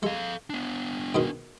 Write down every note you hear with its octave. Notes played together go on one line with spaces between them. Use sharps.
G#3 A4 F5
B3 D4
G#2 B2 D#3